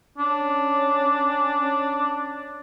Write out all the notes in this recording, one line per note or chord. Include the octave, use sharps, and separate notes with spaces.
C#4 D4